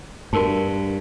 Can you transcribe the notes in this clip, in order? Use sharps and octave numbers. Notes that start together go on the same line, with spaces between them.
G2 F#4 A#4 A5